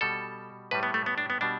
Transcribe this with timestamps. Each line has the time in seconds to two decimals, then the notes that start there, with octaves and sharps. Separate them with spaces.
0.01 B2 G3 A4
0.71 A2 G3 B4
0.83 B3
0.94 A3
1.06 B3
1.18 D4
1.30 B3
1.41 B2 G3 D4